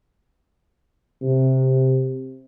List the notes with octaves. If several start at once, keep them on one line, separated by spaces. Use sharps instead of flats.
C3